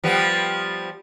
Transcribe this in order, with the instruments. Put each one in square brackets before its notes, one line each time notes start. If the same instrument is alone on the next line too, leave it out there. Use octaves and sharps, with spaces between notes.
[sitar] F3 G3 B3